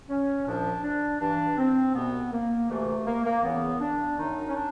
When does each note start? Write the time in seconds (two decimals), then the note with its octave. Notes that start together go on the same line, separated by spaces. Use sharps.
0.09 C#4
0.45 C2 A#2 F3 D4
0.83 D4
1.20 G2 E3 D4
1.57 C4
1.94 C2 B2 B3
2.31 A#3
2.69 D2 C3 E3 A3
3.05 A#3
3.24 A#3
3.43 E2 C#3 E3 B3
3.80 D4
4.17 F#2 D#3 D#4
4.49 C#4
4.55 D4